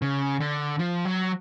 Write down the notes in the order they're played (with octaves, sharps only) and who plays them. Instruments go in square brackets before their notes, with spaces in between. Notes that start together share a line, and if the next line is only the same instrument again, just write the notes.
[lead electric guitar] C#3
D3
F3
F#3